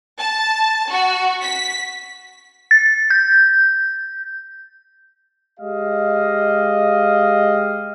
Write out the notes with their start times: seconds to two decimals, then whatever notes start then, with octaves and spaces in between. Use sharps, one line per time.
0.19 A5
0.90 F#4
1.42 B6
2.71 A6
3.10 G6
5.60 G#3 G4 D#5 F5